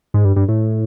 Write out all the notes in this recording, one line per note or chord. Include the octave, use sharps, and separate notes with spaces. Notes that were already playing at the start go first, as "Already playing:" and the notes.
G#2
G2
G2
A2